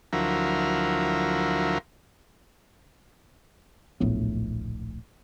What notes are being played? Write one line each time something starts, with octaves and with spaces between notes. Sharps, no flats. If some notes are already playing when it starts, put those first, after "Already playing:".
D2 F3 F#3 E4 A#4
D1 A#1 A2 B3